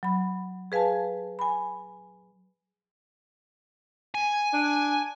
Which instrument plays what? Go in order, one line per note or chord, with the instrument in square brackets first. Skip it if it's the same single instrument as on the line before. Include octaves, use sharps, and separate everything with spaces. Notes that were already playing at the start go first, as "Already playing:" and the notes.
[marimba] F#3 B5
G#4 B4 F5 G#5 A5
G#5 B5
[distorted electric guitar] G#5
[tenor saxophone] D4